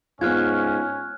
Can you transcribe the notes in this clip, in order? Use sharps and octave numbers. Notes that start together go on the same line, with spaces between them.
G#2 B3 C#4 F4 F6 F#6 G#6